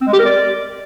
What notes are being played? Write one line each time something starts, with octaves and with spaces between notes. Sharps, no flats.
C4
G#3
G4
A#4
D5